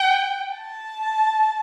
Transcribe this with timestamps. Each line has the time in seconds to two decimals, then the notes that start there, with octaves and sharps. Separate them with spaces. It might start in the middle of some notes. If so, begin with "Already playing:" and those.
Already playing: G5
0.54 A5